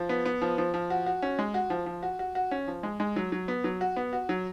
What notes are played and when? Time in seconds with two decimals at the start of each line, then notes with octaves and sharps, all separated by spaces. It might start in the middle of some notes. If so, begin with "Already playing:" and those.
Already playing: F3
0.09 B3
0.26 B3
0.42 F3
0.58 F3
0.74 F3
0.90 F#4
1.06 F#4
1.22 C#4
1.39 G#3
1.54 F#4
1.70 F3
1.86 F3
2.03 F#4
2.19 F#4
2.35 F#4
2.51 C#4
2.67 F3
2.83 G#3
3.00 G#3
3.16 F#3
3.32 F#3
3.48 B3
3.64 F#3
3.81 F#4
3.96 B3
4.13 F#4
4.29 F#3